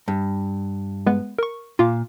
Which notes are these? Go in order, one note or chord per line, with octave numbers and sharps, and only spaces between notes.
G2
G#3 B3 B4
A#4 C#6
A#2 F4 F5 D6